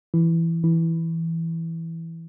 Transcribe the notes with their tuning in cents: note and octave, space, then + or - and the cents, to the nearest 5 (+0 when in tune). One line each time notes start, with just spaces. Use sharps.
E3 +10
E3 +0